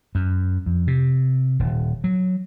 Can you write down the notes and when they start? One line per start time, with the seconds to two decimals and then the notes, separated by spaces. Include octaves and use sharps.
0.15 F#2
0.66 F2
0.87 C3
1.59 D#1
2.04 F#3